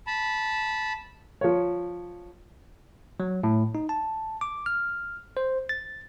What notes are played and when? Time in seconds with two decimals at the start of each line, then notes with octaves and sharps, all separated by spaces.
0.07 A5 B5
1.41 F3 C#5
3.20 F#3
3.43 A2
3.75 D#4
3.89 A5
4.41 D6
4.66 F6
5.37 C5
5.69 A6